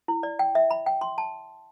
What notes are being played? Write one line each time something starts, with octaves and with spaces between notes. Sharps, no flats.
E4
D5
G5
E5
B5
G5
C6
A5